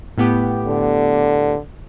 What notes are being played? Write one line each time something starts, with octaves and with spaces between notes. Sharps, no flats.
A2 B3 G4
D3